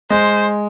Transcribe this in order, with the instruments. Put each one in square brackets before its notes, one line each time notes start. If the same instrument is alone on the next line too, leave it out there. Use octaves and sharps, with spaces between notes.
[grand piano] G#3 [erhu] C5